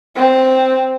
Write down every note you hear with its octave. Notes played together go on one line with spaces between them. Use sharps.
C4